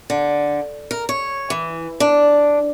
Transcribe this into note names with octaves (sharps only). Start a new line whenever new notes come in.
D3
A#4
C#5
E3
D4